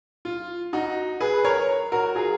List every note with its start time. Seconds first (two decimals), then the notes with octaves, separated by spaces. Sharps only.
0.25 F4
0.73 D#4 F#4
1.20 G#4 B4
1.44 A#4 C#5
1.92 F#4 A#4
2.15 F4 G#4